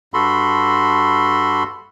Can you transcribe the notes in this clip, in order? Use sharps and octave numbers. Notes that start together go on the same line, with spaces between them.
G2 F#4 A4 B5 C6